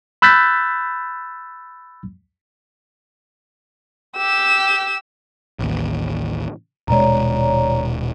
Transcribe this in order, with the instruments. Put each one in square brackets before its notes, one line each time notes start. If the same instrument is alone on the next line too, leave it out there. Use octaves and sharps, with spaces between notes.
[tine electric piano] B5 E6 F#6 G6 A6 B6
[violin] G4 E6
[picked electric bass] A1 D#2
[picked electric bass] D#1 B2 G#3 [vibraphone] C#5 D5 A#5